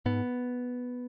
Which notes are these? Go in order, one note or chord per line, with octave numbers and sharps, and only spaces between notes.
G#2 B3